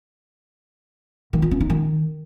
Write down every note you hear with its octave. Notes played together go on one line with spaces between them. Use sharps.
D#3
F4
C#4
D#4
D#3